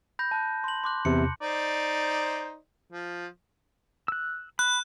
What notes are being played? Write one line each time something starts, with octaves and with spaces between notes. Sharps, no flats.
B5 G6 A#6
A5 F#6
C6 F#7
C6 D6 F#6
E2 C3 C#7
D#4 C5 D5
F3
E6 F#6
B5 F#6